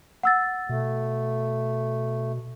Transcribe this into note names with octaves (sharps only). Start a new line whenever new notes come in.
F#5 E6 A6
B2 A3